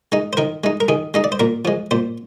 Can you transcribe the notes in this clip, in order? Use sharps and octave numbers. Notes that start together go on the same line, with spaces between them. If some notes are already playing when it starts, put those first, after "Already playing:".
G#3 D#4
C5
D#3 A#4
G#3 D#4
A#4
D#3 G#4
G#3 D#4 D#5
D5
C5
A#2 A#4
F3 G#3
A#2 C5